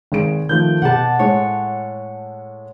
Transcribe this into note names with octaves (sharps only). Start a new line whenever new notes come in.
G#1 G#4 D7
D#3 F3 A3 G6
B2 G4 F#5 A5
A2 G#3 C#5